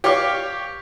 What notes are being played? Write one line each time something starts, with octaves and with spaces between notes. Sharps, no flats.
G4 C#5 D5 F5 C#6 D6